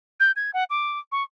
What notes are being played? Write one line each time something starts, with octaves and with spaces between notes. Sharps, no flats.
G6
G#6
F#5
D6
C#6